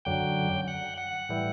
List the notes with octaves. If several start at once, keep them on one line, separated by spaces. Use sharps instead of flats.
F#2 D3 F#3 G5
F#5
F#5
A2 E3 G3